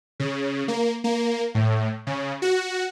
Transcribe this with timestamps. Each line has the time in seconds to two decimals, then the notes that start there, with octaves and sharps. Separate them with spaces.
0.20 C#3
0.68 A#3
1.04 A#3
1.55 A2
2.07 C#3
2.42 F#4